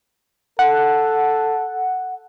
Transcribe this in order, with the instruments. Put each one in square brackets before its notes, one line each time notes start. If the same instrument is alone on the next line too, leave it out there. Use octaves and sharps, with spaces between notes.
[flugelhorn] A4 [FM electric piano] F#5